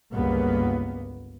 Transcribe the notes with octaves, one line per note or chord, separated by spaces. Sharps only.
G1 C#2 A#3 B3